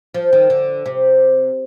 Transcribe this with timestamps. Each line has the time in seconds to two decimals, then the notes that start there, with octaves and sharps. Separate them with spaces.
0.14 F3
0.33 D#3
0.50 D3
0.86 C3